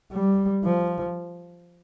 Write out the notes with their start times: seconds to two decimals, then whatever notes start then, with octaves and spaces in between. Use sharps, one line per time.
0.12 G3
0.65 F3